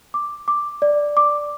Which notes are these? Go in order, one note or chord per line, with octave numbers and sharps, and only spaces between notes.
D6
D6
D5
D6